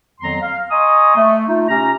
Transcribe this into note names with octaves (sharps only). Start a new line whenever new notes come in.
F2 D#3 F#3 B3 A#5 C6
F5
D#5 G#5 A#5 C6 C#6 D#6
A3
A3 D#4 F4
C3 C#4 A#5